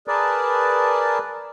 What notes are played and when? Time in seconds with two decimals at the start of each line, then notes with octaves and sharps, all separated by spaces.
0.08 G#4 A#4 B4 D5 A5